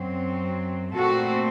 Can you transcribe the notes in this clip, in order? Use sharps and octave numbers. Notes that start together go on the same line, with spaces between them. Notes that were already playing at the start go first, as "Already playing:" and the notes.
Already playing: F#2 F#3 C4
A#2 A3 C4 F#4 A4